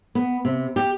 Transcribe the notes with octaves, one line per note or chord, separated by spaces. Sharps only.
B3
C3
G4